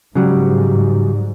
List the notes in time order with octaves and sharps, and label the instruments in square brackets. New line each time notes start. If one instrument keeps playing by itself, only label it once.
[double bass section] G#2 [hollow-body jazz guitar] C#3 F#3 G3